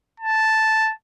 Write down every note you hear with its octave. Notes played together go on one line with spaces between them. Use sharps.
A5